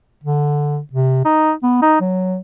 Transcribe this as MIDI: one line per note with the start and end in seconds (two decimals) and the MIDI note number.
0.24 0.78 50
0.93 1.21 48
1.25 1.52 63
1.63 1.81 59
1.82 1.97 63
2.01 2.38 54